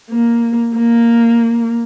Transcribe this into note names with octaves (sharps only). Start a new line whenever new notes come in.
A#3
A#3